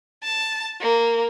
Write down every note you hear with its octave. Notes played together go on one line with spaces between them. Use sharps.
A5
A#3